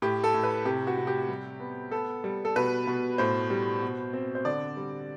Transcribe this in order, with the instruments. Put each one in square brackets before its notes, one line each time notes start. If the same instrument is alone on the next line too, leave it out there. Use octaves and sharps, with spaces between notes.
[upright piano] A2 G4
A4
A2
B4
C3 G4
F#4
C3
G4
G3
B3
B3 A4
G3
A4
B2 B4
B2
A2 C5
G3
B2
C4
C5
D3 D5
G3